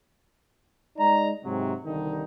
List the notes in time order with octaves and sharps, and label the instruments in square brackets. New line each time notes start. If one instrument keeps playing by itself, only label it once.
[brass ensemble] G#3 D#4 D5 A#5
G#2 C3 F#3
C2 G2 D3 D#3 D#4